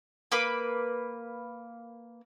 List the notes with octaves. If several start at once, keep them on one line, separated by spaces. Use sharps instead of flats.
A#3 B4 B5 D6